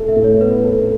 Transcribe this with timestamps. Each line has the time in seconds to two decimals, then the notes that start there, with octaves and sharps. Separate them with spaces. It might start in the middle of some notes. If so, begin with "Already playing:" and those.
Already playing: A2 A4
0.08 E5
0.16 A2
0.24 C#5
0.41 B3 B4
0.65 A4